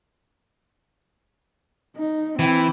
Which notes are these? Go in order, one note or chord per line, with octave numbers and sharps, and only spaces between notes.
D#4
E3 C4 G5